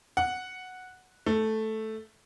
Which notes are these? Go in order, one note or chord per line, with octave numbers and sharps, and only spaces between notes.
F#5
A3